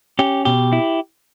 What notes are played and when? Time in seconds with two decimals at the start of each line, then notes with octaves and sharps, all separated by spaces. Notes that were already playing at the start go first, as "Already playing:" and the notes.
0.19 C#4 G4
0.45 B2 G4
0.73 E4